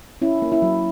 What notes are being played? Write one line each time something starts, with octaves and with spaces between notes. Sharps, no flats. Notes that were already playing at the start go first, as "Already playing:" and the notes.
C#4 E4
A#3
E4
F#3